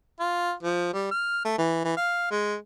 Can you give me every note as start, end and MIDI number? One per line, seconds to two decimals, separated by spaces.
0.20 0.53 65
0.63 0.93 53
0.94 1.06 55
1.11 1.43 89
1.45 1.54 57
1.58 1.81 52
1.85 1.93 52
1.97 2.31 77
2.31 2.56 56